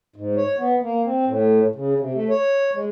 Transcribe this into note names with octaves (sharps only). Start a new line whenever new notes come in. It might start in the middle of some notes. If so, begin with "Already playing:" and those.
G#2
C#5
B3
A#3
C4
A2
C#3
C3
A3
C#5
G#3